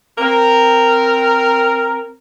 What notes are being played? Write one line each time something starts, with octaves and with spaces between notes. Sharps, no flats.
C4 A#4